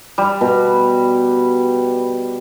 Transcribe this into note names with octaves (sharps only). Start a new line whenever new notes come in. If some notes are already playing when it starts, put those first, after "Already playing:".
G3
B2